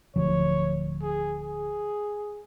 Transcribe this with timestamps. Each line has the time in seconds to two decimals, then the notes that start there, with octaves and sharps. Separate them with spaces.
0.16 D1 D2 F3 C#5
1.02 G#4
1.40 G#4